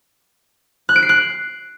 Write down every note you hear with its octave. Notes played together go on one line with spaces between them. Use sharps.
F#6
D7
C7
F#6